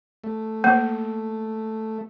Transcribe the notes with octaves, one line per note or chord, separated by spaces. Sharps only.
A3
A#3